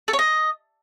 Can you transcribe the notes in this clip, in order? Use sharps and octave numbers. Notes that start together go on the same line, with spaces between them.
A4
C#5
D#5